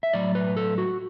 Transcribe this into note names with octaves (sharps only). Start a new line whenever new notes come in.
E5
A2 F#3 D5
B4
A4
F#4